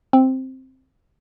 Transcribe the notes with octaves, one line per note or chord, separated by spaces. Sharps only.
C4